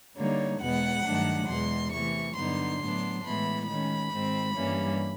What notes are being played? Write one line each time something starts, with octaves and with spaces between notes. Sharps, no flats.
D3 G3 A#3 D#4 C#5
E2 B2 G#3 B3 F#5
G2 D#3 F#3 A3 D4
E2 B2 G#3 C6
C3 E3 A3 C#6
G2 D3 F#3 B3 D#4 C6
A2 F#3 B3 D4
A2 E3 G#3 B3 B5
D#3 G#3 C#4 B5
G#2 D#3 G#3 C4
G2 E3 G3 A#3 C#4